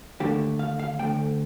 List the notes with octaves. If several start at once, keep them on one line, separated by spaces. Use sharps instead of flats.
D#2 D3 A3 G4
F5
F5
D2 D3 A3 G5